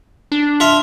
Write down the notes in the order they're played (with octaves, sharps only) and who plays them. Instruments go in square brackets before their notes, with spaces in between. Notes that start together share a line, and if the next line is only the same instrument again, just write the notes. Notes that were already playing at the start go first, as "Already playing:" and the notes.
[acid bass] D4
[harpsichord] F4 E5 F5